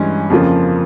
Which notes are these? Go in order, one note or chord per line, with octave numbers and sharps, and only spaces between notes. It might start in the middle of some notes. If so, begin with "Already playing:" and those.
Already playing: G2 E3 G#3 C#4
F2 C#3 F3 A#3